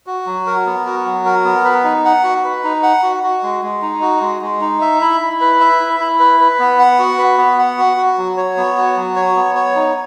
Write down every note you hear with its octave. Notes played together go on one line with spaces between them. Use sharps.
F#4
F#3
A#4
B3
F#4
F#3
A#4
B3
B4
D#4
F#5
F#4
B4
D#4
F#5
F#4
F#4
G#3
G#3
D#4
F#4
G#3
G#3
D#4
E5
E4
E4
B4
E5
E4
E4
B4
B4
B3
F#5
F#4
B4
B3
F#5
F#4
F#4
F#3
C#5
B3
F#4
F#3
C#5
B3
C#5
D#4